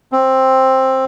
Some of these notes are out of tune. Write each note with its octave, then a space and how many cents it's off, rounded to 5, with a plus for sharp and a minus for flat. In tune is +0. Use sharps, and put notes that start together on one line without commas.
C4 +10